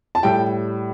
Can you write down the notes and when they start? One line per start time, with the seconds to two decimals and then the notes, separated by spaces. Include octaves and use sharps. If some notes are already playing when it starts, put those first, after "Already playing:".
0.15 A5
0.23 A2 G3 G5